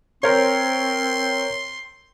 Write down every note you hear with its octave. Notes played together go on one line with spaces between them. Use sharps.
C4 A#4 C5 C#5 C6